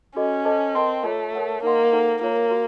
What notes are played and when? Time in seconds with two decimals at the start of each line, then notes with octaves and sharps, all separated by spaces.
0.16 C#4 F#4 A4 D#5
0.45 A4 C5 D#5 A5
0.75 C4 A#4 D#5 A5 C6
1.04 A3 F4 A4 C#5 A5
1.34 A#4 C#5 F#5 A5
1.63 A#3 D#4 A#4 D#5 F#5 C6
1.92 D#4 A4 C5 F#5
2.21 A#3 F4 A#4 C#5
2.51 F#4